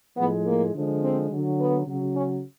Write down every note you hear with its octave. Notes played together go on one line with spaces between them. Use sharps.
A2 F3 G#3 B3
A#3
D3 F3 G#3
C4
D3 F#3
B3
C#3 F#3
C#4